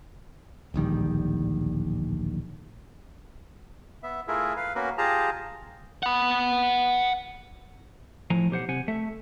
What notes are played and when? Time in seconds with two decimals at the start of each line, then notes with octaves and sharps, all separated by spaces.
0.74 D1 A#1 D#3 G3
4.03 B3 E5
4.28 A3 E4 F4 G#4 A#4 E5
4.57 B4 F5
4.75 A#3 B3 C#4 F#4 A#4 B4
4.98 F4 G4 G#4 A5 A#5
6.03 F#5 B5
8.30 A2 F3 G#5 A#5
8.51 B1 G4 C5 F#5
8.69 C3 F#5 G#5
8.88 A3 E5